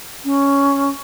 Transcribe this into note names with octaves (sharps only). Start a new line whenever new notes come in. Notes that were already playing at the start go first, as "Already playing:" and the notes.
C#4